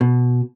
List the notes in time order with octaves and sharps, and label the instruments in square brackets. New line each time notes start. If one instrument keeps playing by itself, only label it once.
[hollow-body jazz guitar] B2